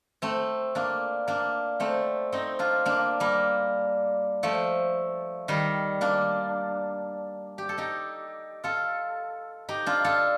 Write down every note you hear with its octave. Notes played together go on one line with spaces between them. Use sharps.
A3 C4
A#3 D4
A#3 D4
A3 C4
C4 D#4
D4 F4
A#3 D4
G3 A#3
F3 A3
D#3 G3
A#3 D4
G4
A4
D#4 G4
F4 A4
D#4 G4
D4 F4
F4 A4